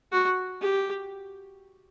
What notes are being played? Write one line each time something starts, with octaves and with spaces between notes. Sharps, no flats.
F#4
G4